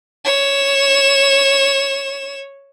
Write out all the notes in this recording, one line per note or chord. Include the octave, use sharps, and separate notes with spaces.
C#5 E7